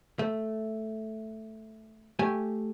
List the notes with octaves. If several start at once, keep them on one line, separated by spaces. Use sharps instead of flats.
A3
A3 G4 G#5